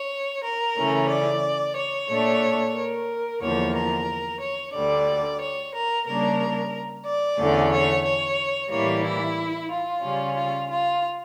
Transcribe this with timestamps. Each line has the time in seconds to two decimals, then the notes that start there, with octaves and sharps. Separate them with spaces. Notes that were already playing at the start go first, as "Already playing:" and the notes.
Already playing: C#5
0.43 A#4
0.76 C#3 E3 A3 C#4
1.09 D5
1.76 C#5
2.09 A#2 A3 D4
2.75 A#4
3.42 E2 D3 F3 A#3 C#5
3.75 A#4
4.41 C#5
4.74 D2 D3 G3 D5
5.41 C#5
5.73 A#4
6.06 C#3 G3 A#3 D4 A#4
7.06 D5
7.38 E2 D3 A3 C#4
7.72 C#5
8.04 C#5
8.71 A2 E3 G3 A#3 C#5
9.04 E4
9.70 F4
10.03 C#3 G3 C#4
10.36 F4
10.70 F4